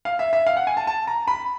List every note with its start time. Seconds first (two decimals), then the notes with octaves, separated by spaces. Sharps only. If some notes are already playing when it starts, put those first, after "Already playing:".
0.05 F5
0.19 E5
0.33 E5
0.47 F5
0.57 F#5
0.67 G#5
0.77 A5
0.87 A5
1.07 A#5
1.28 B5